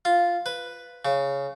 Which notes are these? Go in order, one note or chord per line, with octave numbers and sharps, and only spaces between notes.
F4
B4
C#3